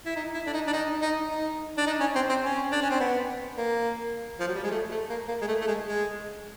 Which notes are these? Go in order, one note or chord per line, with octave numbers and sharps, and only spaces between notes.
E4
D#4
E4
D4
D#4
D4
D#4
D#4
D#4
D4
D#4
C#4
C4
C4
C#4
D4
C#4
C4
B3
A#3
F3
F#3
G3
G#3
A3
A3
A#3
A#3
G#3
A3
A3
G#3
G#3